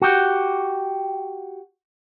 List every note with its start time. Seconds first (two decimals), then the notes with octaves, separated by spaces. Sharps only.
0.02 F#4 G4